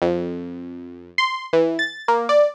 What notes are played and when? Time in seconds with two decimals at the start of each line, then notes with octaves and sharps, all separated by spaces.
0.02 F2
1.18 C6
1.53 E3
1.79 A6
2.08 A#3
2.29 D5